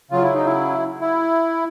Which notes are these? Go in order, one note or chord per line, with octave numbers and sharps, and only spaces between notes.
C#3 F#3 F4
E4
D#4
E4
E4